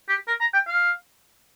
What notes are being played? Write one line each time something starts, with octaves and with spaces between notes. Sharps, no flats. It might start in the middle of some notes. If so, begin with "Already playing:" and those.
G4
A#4
A#5
G5
F5